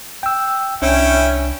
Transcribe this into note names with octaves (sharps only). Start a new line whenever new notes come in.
G5 E6
C2 C#4 D4 E4 G5